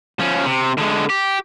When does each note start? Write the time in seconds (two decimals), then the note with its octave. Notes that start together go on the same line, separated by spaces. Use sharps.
0.20 F3 C#4
0.46 C3
0.78 D3 G#3
1.10 G4